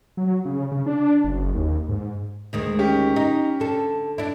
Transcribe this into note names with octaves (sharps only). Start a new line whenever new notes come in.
F#3
C#3
C#3
D4
F#1
D#2
G#2
D2 D#3 G#3
C#4 G4
D#4
D3 A4
D4 E4